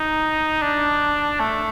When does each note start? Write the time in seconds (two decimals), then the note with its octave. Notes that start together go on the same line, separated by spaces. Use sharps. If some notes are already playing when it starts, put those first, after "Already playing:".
Already playing: D#4
0.62 D4
1.40 A3